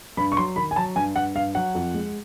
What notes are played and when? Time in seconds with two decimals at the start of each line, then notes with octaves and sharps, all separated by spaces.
0.17 G2 B5
0.32 C#6
0.37 F#3 C6
0.56 D#3 B5
0.71 G#5
0.76 F#3 A5
0.96 G2 G#5
1.16 G2 F#5
1.35 G2 F5
1.55 F#3 F#5
1.75 F2
1.94 G#3